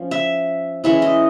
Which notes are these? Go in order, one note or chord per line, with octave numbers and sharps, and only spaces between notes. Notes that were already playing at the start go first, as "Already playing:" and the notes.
Already playing: F3 C#4
E5
E3 G#3 C#4 E4 E5
D#5